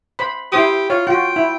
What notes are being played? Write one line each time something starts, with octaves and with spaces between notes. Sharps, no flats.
C5 B5
E4 G4 C5 D#6
F4 C#5
F4 F#4 G5
E4